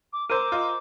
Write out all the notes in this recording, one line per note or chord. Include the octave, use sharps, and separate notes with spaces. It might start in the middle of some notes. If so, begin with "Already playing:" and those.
D6
A#4 C5 A#5 D6 E6 D#7
F4 D#5